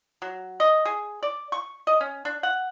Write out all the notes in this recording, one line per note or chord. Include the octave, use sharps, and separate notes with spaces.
F#3
D#5
G#4
D5
C#6
D#5
C#4
D4
F#5